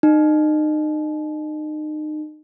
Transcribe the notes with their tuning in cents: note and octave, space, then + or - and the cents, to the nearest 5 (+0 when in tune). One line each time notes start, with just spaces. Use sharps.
D#4 -30